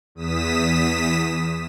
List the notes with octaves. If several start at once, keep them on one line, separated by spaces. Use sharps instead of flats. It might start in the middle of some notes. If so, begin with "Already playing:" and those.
E2 D#6 B6 E7